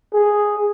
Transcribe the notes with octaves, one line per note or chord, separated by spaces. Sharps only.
G#4